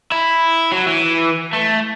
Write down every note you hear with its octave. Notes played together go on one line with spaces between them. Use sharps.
E4
F#3
E3
A3